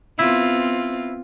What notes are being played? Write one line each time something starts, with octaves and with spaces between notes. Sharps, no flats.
B3 C4 E4 F4